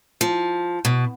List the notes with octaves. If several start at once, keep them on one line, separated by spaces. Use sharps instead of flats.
F3
B2